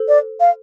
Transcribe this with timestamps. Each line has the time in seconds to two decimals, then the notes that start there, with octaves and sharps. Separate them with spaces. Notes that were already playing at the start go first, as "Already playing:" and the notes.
Already playing: A4 C5
0.08 D5
0.40 F5